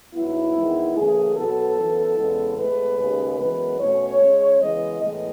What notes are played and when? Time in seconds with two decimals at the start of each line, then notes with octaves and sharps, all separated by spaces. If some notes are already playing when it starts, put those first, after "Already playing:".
0.14 G#2 F#3 B3 E4
0.54 E2 D#3 G#3 B3
0.95 F#2 C#3 E3 A3 G#4
1.36 B2 F#3 B3 A4
1.76 F#2 E3 B3
2.17 E2 C#3 G#3 B3
2.57 A2 G#3 B3 B4
2.98 D#2 C#3 G#3 C#4
3.39 F#2 E3 G#3 B3 B4
3.79 B2 A3 C#4 C#5
4.20 C#3 G#3 C#4
4.60 C#3 E3 G#3 B3 D#5
5.01 A2 E3 G#3 B3 D#5